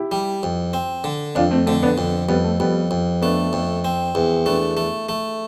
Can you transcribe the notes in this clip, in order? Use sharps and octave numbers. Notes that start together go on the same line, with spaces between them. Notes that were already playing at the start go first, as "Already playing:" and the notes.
Already playing: E4 G4
G3
F2
C4
D3
F2 D4 F4
A3 C4
D3 A3 C4
B3 D4
F2
F2 G3 B3
A3
F2 G3 B3
F2
A3 B3 D4
F2
C4
E2
A3 B3 D4
A3
A3